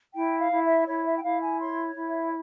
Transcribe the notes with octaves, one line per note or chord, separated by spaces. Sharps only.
E4 G5
F5
E4
E5
E4 C#5
E5
G5
E4 F5
G#5
C#5 C6
E4
E5